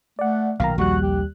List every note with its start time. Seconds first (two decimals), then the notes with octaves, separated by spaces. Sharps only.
0.19 A3 D5 F#5
0.60 B1 A#2 D#3 F5 A#5
0.78 A#1 D#2 G3 F#4 F#6
1.02 G4